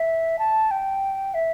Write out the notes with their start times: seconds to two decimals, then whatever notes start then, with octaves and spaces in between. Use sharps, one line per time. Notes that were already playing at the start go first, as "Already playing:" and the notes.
Already playing: E5
0.39 A5
0.71 G5
1.34 E5